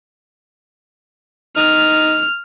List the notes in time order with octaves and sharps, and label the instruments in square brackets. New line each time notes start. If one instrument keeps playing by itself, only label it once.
[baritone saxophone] D#4 [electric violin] F6